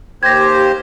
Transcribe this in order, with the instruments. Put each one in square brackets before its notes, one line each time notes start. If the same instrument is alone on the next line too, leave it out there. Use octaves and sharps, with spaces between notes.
[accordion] D#2 G4 C5 [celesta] G#6 A#6